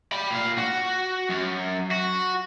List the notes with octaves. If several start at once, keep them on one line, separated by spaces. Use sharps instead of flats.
G5 B5
A#2 F5
F#4
F#2
F#4